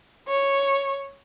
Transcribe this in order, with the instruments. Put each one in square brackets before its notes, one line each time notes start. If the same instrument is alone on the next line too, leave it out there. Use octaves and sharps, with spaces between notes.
[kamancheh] C#5